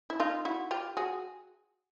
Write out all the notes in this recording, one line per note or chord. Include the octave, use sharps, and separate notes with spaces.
E4
D#4 F4
E4 F#4
F4 G4
F#4 G#4